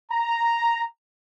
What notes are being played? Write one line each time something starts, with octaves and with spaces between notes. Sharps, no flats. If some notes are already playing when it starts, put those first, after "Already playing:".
A#5